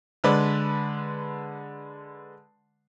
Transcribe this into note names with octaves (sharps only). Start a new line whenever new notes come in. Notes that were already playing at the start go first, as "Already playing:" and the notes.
D3 G#3 B4 D5